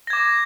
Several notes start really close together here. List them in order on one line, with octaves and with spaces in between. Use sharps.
A#6 G#6 D6